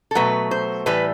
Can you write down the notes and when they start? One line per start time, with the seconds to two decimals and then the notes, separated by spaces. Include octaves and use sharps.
0.11 A4
0.15 B2 F#3 A3 B4
0.51 C5
0.86 A2 E3 G3 B4